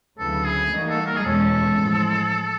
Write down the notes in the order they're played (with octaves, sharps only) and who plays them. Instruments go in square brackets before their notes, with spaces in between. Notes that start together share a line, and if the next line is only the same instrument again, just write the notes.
[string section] D2 C#3 F#3 B3 E4 [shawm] A4
[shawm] G#4
[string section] E3 G3 A#3 D#4 F#4
[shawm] A4
A#4
G#4
[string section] E2 B2 G#3 C#4 [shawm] A4
[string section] A2 F3 G#3